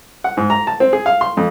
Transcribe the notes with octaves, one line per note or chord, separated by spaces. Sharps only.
F#5
G#2
A#5
A5
C4
G#4
F5
C6
F2